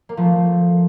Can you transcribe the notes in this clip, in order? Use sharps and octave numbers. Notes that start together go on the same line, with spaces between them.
A#3
F3 A3